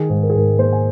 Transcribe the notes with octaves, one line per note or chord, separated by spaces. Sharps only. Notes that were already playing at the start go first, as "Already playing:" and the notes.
Already playing: D#3 G#4
G#2
A#4
G#4
G#2 A#4
A#3 C5
G#5